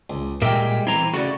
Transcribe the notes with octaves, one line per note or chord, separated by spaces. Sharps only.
C#2
A#2 G3 G#3 A#4 E5 G5 D6
E3 C4 E4 A#5
C#3 A3 F#4 D5